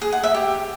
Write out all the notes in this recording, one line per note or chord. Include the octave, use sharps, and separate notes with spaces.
G#4
F#5
E5
G4